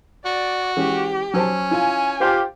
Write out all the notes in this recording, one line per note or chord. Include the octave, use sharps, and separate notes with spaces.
F#4 D5
E3 G#3 C#4 G4
F#3 C#4 C5 A5
E4 F4 G#5
F4 G4 C5 F5 G5